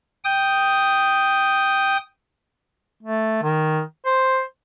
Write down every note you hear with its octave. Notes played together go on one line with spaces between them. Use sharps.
G5 D#6
A3
D#3
C5